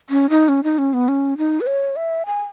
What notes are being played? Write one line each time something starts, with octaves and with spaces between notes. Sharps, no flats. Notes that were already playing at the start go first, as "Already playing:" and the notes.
C#4
D#4
C#4
D#4
C#4
B3
C#4
D#4
B4
C#5
E5
G#5